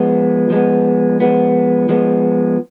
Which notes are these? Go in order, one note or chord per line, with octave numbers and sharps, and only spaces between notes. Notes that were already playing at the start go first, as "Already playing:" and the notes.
Already playing: F3 G#3 B3
F3 G#3 B3
F3 G#3 B3
F3 G#3 B3